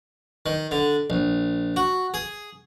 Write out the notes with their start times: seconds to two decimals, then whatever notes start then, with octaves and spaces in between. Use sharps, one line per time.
0.46 D#3
0.71 D3
1.10 A#1
1.76 F#4
2.14 G#4